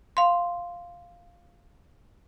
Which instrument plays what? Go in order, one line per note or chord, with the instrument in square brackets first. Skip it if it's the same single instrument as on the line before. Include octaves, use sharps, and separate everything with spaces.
[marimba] F5 C6